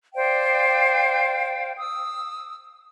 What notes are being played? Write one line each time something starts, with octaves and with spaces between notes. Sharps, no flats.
C5 D5 F5 G5
D#6 E6